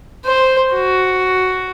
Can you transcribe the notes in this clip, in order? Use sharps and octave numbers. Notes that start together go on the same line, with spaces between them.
C5
F#4